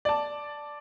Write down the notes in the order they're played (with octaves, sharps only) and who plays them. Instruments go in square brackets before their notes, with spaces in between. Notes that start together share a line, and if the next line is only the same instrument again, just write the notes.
[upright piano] D5 A5